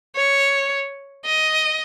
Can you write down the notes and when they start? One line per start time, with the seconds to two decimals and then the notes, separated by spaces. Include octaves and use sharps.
0.15 C#5
1.25 D#5